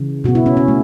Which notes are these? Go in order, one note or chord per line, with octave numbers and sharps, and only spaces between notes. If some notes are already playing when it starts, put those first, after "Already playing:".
Already playing: C#3 E3
B2 B3 F#4
E4
C#4
C#4
A3